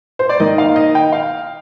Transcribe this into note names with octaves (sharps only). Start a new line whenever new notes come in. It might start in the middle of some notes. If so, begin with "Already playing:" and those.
C5
D5
D#3 A#3 D#5
F5
D#5
G5
F5